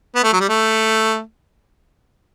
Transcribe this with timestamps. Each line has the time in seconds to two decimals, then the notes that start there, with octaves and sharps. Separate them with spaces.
0.16 B3
0.24 A3
0.33 F#3
0.40 G3
0.49 A3